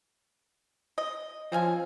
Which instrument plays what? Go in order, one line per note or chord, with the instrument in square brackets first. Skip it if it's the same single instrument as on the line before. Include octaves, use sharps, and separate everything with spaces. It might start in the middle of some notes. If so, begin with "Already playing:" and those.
[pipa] D#5
[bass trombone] F3 [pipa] C4 C#4 G#5